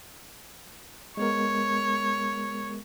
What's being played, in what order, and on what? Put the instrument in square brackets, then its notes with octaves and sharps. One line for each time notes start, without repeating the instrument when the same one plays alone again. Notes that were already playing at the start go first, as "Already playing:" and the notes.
[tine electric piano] G#3 B3 A#4 [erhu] C#5